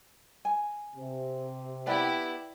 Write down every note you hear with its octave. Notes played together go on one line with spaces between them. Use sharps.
G#5
C3
B3 E4 G4 D5 G5